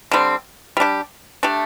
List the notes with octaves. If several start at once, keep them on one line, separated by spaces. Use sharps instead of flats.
D3 G3 C4
G3 D4 G4
A3 D4 G4